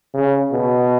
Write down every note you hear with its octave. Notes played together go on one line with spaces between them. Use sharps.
C#3
B2